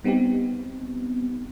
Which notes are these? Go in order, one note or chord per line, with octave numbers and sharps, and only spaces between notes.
G3 B3 C4 D#4 G4